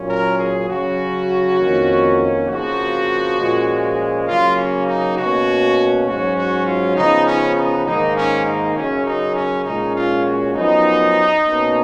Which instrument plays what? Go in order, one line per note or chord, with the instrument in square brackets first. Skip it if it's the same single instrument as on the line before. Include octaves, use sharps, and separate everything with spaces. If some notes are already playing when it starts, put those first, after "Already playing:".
Already playing: [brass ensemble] A#2 F#3 C#4
A#4
G#4
C#3 F#3 C#4 F#4
F2 D#3 A#3 C#4
F2 C#3 F3 A#3 F#4
A#2 F3 G#3 C#4
C#3 F#3 A#3 F4
C#4
D#4
B2 A#3 C#4 F#4
G#2 F#3 C#4 F#4
F#4
F4
C#3 F3 B3 D#4
C#4
D#4
G#2 D#3 A#3 D#4
C#4
D#4
F#2 C#3 F#3 C#4
D#4
C#4
A#2 G#3 C#4 D#4
F4
F#4
F#2 F3 B3 D#4
B2 A#3 C#4